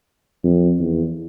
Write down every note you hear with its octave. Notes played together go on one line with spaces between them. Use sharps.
F2
E2